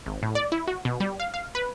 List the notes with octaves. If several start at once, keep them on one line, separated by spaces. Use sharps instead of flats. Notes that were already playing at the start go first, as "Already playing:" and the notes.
G#1
A2
D5
E4
F#4
B2
G3
F5
F5
B4